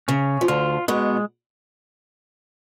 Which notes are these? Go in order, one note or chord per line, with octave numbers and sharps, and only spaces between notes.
C#3 C#4
F3
D2 D3 F4
B2 G#3 B3